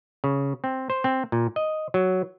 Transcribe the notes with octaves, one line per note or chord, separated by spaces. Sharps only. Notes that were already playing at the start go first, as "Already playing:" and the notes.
C#3
C4
C5
C4
A#2
D#5
F#3